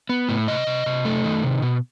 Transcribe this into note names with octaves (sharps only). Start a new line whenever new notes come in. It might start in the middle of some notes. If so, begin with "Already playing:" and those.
B3
A2
C3 D#5
C3
C3
A3
D#3
C3
B2